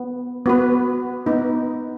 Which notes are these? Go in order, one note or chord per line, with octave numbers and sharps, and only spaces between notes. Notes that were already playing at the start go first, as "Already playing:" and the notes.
Already playing: B3
B3 F#4 B4
B3 D#4 B4